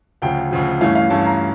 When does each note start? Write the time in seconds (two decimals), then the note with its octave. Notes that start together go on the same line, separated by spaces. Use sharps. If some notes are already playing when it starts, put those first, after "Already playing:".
0.22 D2 C#3 F3 G5
0.51 D2 C#3 F3
0.81 G2 E3 A3 C#4 F5
0.95 F5
1.10 G2 E3 A3 C#4 A5
1.25 A#5